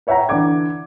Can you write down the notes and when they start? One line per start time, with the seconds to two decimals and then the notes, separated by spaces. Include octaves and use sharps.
0.07 B4 C#5 E5 F#5 G5 A#5
0.29 D3 E3 D5 D6 G#6